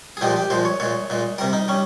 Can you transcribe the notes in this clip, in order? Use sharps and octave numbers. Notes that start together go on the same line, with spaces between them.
G#4
A#2 F3 G#3 G4
G4
A#2 F3 G#3 C5
C#5
A#2 G#3 C#5
A#2 G#3
C3 G3 A#4
D#4
G3 C#4